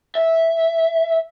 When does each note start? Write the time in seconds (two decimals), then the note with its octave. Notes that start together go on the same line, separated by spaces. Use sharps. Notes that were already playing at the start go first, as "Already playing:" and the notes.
0.15 E5